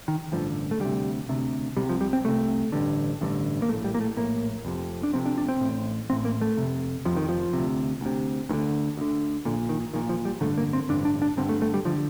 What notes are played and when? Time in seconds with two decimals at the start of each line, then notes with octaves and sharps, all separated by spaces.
0.08 D#3
0.32 A1 G2 D3 F3
0.71 A3
0.80 D2 C3 G3
1.29 D2 C3
1.77 C2 C3 G3
1.89 F3
2.01 G3
2.13 C4
2.24 C2 C3 A3
2.72 A1 G2 D3
3.21 A1 G2 D3
3.62 A#3
3.68 A#1 A3
3.72 A2
3.84 G3
3.94 A#3
4.01 A3
4.17 A#1 A2 A#3
4.65 F1 F2 C3
5.03 D4
5.13 F1 F2 C3 C4
5.26 D4
5.38 D4
5.48 C4
5.61 A1 A2
6.10 A1 A2 C4
6.25 A#3
6.41 A3
6.57 F1 F2 C3
7.05 F1 F2 C3 F3
7.17 D#3
7.29 F3
7.53 D2 C3
8.01 D2 C3
8.49 D2 D#3
8.53 D3
8.97 D2 D3
9.45 A#1 A#2 D3
9.69 D#3
9.93 A#1 A#2 D#3
10.09 F3
10.25 G3
10.41 A1 G2 D3 A3
10.58 A#3
10.73 C4
10.89 A1 G2 D3 D4
11.05 D4
11.22 D4
11.37 G1 G2 D3 C4
11.49 A3
11.62 A3
11.74 G3
11.85 D3 F3